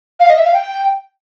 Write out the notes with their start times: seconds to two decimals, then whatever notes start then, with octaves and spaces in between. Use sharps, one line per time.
0.20 F5
0.28 D#5
0.37 E5
0.45 F5
0.54 G5